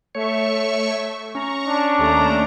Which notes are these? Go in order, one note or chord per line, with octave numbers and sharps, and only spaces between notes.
A3 C#5 E5 C#6
C#4 A#5 C#6
D4
D#2 A3 A#5